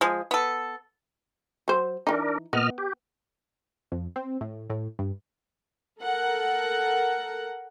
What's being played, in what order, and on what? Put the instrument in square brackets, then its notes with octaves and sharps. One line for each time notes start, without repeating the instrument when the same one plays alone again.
[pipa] F3 G#3
B3 A4
[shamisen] F#3 C5
[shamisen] E3 D#4 [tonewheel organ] D4 A#4
[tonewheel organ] A#2 D#5 F6 [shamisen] B3
[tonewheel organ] G4
[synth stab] F2
C4
A2
A2
G2
[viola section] A4 A#4 F#5